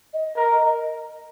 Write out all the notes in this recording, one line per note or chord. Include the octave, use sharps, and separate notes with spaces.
D#5
A#4